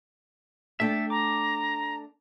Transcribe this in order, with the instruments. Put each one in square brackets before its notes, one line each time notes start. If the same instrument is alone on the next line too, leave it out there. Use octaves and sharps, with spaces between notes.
[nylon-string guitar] A3 D4 G5 [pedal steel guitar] A4 E5
[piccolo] A#5 [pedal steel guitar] D6